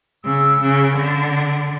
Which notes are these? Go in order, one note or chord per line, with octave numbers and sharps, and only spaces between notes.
C#3 E6
C#3
D3